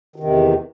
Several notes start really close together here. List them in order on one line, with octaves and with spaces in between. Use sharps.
D#3 C3 E2